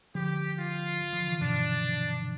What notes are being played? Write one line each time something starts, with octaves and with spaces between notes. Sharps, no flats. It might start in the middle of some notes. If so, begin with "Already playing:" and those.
D3 F3 G4
F4
D3 F3
C3 E3
G2 B2 D4